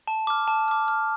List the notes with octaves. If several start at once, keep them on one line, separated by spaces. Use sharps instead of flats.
A5
D6 F6
A5
D6 F6
F6